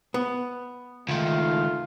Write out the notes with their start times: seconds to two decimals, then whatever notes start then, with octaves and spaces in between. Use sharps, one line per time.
0.14 B3
1.09 C#2 D#3 A3 F4